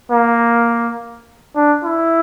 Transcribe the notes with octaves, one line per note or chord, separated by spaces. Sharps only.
A#3
D4
E4